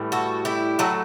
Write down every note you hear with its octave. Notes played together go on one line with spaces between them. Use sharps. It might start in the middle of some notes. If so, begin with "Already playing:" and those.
Already playing: A2 E3 G3
F#4 A4
E4 G4
A2 F#3 A3 F#4 A4